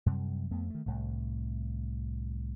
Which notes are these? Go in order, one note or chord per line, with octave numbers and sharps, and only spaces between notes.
F#2 C3 G3
F2 A3 B3
D#3 A3
C2 F#2 A2